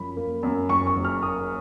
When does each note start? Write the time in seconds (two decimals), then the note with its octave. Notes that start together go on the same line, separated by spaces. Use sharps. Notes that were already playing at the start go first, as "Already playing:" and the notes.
Already playing: F#2 F3 B5
0.17 A#3
0.43 F#2
0.69 F#1 C#6
0.87 C#6
0.96 F#1
1.05 F6
1.23 A#3 D#6